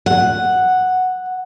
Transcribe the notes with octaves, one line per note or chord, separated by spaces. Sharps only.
F#5